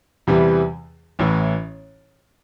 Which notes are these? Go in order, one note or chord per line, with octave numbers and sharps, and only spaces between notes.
E2 C3 E3 G3
A1 A2 E3